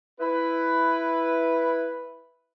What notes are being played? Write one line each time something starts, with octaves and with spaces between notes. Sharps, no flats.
E4 B4